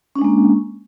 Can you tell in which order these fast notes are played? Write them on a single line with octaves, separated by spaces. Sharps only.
C#4 D4 G#3 A#3